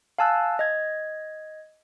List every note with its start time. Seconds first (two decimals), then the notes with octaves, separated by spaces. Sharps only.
0.18 F5 G#5 A5 E6 F#6
0.59 D#5 G#6